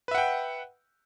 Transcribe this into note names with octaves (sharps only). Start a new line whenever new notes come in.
B4 E5 F#5 G5